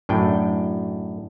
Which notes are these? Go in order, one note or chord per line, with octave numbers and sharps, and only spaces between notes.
F#2 A2 D4 G5